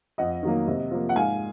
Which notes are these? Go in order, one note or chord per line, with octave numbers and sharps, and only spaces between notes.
F2 D#5 F#5
D#3 F#3 A#3
C3
F3 A#3
F#5
G#2 F5 G#5